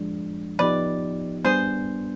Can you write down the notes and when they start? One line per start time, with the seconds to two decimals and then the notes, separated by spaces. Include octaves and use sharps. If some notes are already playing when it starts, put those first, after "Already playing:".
Already playing: F3 G#3 D4
0.59 F3 B3 D#4 G4 B4 D5
1.45 G3 B3 D4 G#4 C5